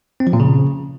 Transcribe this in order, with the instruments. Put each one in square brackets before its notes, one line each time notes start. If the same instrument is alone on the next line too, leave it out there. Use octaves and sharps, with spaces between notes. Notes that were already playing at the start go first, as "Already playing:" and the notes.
[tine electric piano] C4
F3
A#2
C#3